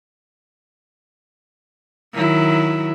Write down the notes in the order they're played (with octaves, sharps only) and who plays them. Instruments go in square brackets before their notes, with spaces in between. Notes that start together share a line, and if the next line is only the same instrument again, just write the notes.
[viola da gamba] D#3 F#3 E4